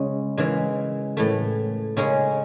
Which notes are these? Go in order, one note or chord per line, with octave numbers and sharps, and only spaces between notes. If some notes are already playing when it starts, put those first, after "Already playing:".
Already playing: C#3 G#3 C#4
C#3 E3 G#3
A2 E3 A3
C#3 G#3 C#4 G#4